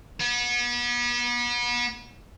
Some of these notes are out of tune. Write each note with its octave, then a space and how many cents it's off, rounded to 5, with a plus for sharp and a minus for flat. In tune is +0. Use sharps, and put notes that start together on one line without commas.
B3 -35